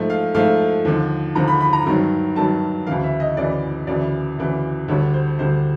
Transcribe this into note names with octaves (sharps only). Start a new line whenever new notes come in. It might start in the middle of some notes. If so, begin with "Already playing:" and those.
Already playing: G#2 F3 A3
F5
G#2 F3 A3 F5
D#2 D3 F3
D#2 D3 F3 A#5
B5
B5
A#5
G2 D#3 F#3
G2 D#3 F#3 A5
D2 C#3 E3 F5
E5
D#5
D2 C#3 E3 D5
D2 C#3 E3 D5
D2 C#3 E3
D2 D3 G3 C#5
C5
D2 D3 G3 C5